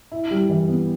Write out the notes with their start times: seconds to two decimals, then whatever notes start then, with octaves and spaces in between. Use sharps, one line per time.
0.12 E4
0.31 G3
0.49 E3
0.68 B3